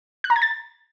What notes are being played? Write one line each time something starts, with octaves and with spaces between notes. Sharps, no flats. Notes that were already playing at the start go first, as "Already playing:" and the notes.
F#6
A#5
G#6
A6